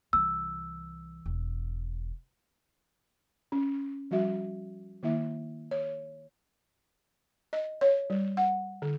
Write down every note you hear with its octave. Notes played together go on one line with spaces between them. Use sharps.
C2 E3 E6
E1
C#4
F3 G3 F#4 E5
D#3 A#3 E4 E5
C#5
D#5
C#5
G3
F#5
D3